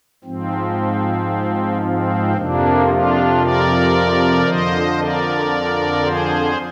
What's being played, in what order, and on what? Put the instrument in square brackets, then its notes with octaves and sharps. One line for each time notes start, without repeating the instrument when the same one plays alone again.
[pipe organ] G#2 F3 C4
C4
F2 C3 F3 A#3 D4
D4 F4
A#4 D5
F2 D3 F3 C5 D#5
A#4 D5
G#4 C5